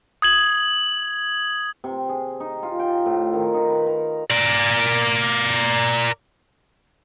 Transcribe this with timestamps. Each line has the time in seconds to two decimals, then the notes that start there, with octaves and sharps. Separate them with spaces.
0.22 D#6 G#6 F#7
1.84 C3
2.09 G#4
2.40 D#4
2.63 F4
2.79 G5
3.06 A2
3.34 D#3
3.54 D#4
3.70 B4
3.87 A#4
4.31 A#4 D5